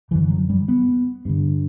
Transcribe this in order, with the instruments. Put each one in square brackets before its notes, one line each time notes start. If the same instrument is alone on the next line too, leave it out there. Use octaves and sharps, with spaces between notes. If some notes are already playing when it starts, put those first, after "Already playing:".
[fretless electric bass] D3 E3
F#2
F#3
G3
B3
G2 D3